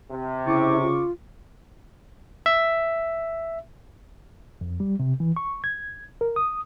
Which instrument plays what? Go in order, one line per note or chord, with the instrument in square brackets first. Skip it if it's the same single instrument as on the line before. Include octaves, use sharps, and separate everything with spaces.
[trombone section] C3
[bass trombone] C#3 [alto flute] E4 [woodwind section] C#6 D6
[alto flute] F4
[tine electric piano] E5
[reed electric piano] F2
G3
C3
E3
C#6
G#6
A#4
D#6